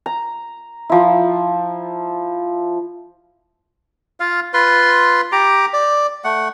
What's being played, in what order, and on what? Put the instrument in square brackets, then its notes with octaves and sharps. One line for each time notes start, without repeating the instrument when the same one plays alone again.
[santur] A#5
F3 E4
[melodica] F4 F5
F4 B4 C6
G4 A#5 D6
D5
A3 F#5